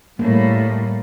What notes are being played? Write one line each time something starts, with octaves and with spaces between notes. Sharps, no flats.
A2 G3 A#3